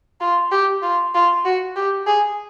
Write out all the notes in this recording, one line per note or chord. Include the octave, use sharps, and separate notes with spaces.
F4
G4
F4
F4
F#4
G4
G#4